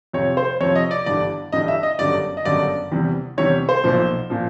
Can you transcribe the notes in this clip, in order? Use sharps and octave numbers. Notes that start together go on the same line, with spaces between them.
F2 C3 F3 C#5
C5
F2 C3 F3 C#5
D#5
D5
G1 G2 E3 G3 D5
G1 G2 E3 G3 D#5
E5
D#5
G1 F#2 D3 G3 D5
D#5
G1 F#2 D3 G3 D5
E2 C3 E3 G3
E2 C3 E3 G3 C#5
C5
B1 A#2 F3
A#2 F3